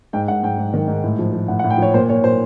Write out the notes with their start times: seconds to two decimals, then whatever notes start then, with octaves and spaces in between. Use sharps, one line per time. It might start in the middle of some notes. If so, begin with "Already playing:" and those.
0.13 G#2 G5
0.28 G#2 F#5
0.43 G#2 G5
0.58 G#2
0.73 D#3
0.88 G#2
1.04 A2
1.19 F3
1.33 F3
1.48 A2 F#5
1.59 F#5
1.64 A2
1.70 G5
1.78 F3 C#5
1.94 A#2 C5
2.09 A#2 C#5
2.24 A#2 C5